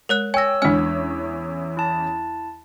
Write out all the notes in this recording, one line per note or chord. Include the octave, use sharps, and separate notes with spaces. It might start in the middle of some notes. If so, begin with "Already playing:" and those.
G#3 A#4 C#5 F#6
C#5 G5 G#5 E6 A#6
E2 G#3 C#4 D4 G#5 F6
E4 A5